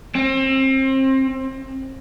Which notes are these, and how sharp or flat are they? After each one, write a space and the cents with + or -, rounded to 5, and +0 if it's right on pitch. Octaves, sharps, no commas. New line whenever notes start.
C4 +30